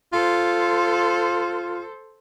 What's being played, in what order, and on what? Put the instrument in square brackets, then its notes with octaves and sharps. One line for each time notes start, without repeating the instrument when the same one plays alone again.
[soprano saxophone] F4 [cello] A4 C5